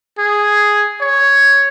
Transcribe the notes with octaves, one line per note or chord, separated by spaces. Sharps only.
G#4
C#5